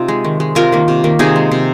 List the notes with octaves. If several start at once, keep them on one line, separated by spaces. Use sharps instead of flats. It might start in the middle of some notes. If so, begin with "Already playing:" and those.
Already playing: C3 D#4 F4
G#3
D#3
G#3
C3 F4 A#4
D#3 A#3
C3
D#3 A#3
C3 D#4 G#4
G#3
C3